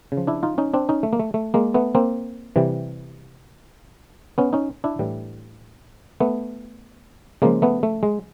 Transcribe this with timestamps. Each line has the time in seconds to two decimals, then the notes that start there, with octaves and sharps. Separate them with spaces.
0.12 C#3
0.17 F3
0.27 D4 E4
0.43 D#4 F4
0.58 C#4 D#4
0.74 C4 D4
0.89 C#4 D#4
1.03 A3
1.13 A#3
1.19 A3
1.34 A3
1.54 G#3 A#3
1.74 A3 B3
1.95 A#3 C4
2.56 C3 E3 G3
4.38 B3 C#4
4.53 C#4 D#4
4.84 D4 E4
4.99 A2 E3 G3
6.20 A3 B3
7.42 C#3 F3 G#3 A#3
7.62 A3 B3
7.83 A3
8.03 G#3